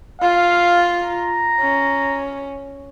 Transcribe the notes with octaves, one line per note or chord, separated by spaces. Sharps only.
F4 F5
A#5
C#4